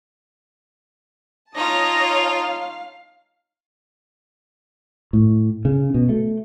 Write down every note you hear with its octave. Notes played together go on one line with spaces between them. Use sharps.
D#4 F4 C#5 A5 D#6 A#6
F5
A2
C#3
B2
A3